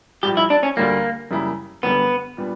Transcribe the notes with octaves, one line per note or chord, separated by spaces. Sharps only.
A#1 A#2 G3 G4
E4
D4
C#4
D2 D3 G3 A#3
F#2 C#3 G3 A#3 E4
F#1 F#2 D3 G3 B3
A#2 G3 B3 D4